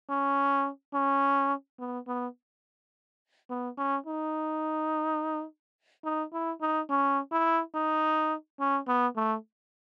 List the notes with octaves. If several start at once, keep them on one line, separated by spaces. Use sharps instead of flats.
C#4
C#4
B3
B3
B3
C#4
D#4
D#4
E4
D#4
C#4
E4
D#4
C#4
B3
A3